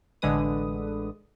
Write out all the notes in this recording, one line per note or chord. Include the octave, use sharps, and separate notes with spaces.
A1 D3 G#3 B4 D#6